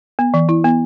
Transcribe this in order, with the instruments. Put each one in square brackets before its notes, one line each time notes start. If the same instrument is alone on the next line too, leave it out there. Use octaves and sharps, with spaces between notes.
[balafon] B3
E3
E4
B3